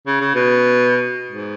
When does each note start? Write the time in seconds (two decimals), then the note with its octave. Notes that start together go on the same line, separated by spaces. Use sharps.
0.07 C#3
0.21 C#3
0.35 B2
1.31 G#2